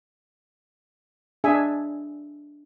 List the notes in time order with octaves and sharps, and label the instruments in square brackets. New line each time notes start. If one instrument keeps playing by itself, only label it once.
[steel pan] D4 G#4 E5 G#5